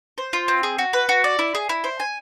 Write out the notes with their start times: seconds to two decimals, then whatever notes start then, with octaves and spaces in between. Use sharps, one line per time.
0.18 C5
0.33 F4
0.48 C4
0.63 G#4
0.78 F#4
0.93 B4
1.09 F#4
1.24 D5
1.39 E4
1.55 G#4
1.69 E4
1.84 C5
2.00 G#5